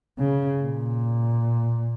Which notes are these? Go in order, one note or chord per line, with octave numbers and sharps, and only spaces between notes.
C#3
A#2